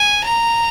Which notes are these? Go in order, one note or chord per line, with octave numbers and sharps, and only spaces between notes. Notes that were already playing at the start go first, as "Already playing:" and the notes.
Already playing: G#5
A#5